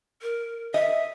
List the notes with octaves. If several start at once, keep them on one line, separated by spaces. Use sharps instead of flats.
A#4
D#5 E5